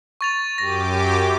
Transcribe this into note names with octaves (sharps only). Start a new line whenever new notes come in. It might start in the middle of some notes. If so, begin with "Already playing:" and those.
C#6 A6 F7
F#2 G4 D6 A#6